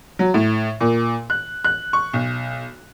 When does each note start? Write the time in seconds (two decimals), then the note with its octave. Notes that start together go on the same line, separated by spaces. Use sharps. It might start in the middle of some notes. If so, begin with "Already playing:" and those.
0.19 F#3
0.34 A2
0.81 A#2
1.30 F#6
1.64 F#6
1.93 C#6
2.13 B1